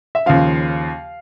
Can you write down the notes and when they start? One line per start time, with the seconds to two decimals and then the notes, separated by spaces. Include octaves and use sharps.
0.15 E5
0.26 D#2 C#3 F3 F5